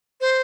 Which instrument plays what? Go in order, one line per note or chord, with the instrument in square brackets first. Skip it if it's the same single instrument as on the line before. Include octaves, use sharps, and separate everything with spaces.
[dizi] C5